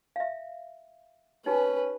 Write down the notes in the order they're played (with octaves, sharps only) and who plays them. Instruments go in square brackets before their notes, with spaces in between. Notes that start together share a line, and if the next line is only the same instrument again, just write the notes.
[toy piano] E5 F5
[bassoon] C#4 [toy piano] D#4 G4 G#5 [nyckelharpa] B4